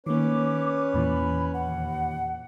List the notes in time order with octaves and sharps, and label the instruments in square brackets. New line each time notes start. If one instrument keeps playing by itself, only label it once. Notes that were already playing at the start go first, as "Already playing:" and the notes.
[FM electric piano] D#3 A#3 [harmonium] C#4 B4 C#5 [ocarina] D6
[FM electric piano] E2 A#2 E3 [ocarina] B5
[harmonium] D#2 [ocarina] F#5